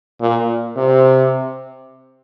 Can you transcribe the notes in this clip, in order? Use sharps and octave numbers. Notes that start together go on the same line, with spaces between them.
A#2
C3